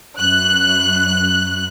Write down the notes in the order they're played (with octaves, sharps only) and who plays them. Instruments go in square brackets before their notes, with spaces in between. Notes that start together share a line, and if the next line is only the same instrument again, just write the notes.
[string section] F#2 F#6